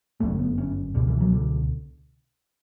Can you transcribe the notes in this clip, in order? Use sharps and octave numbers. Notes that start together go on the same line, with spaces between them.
G1 F#2 D3 A3
B3
C#4
C#2 B2 D3
E3
F#3
D3